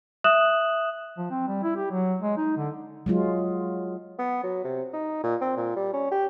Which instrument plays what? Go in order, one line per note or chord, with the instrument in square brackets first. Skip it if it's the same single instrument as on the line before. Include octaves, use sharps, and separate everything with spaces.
[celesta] E5 D#6 F#6 E7 F#7
[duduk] F3
C4
G3
E4
G4
F#3
G#3
D#4
D3
[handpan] F#3 G#3 F4
[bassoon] B3
F#3
C3
D#4
A#2
C4
A#2
G3
C#4
G4